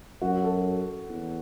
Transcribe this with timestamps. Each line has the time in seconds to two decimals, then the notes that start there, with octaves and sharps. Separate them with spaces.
0.22 F#2 F#4
0.44 A4
1.09 E2